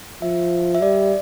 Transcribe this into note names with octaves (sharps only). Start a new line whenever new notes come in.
F3 E5
E5
G3 D5